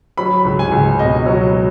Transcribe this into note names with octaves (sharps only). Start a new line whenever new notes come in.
F#3 B5
C#2
G#5
C#2
B2 D#5
F#3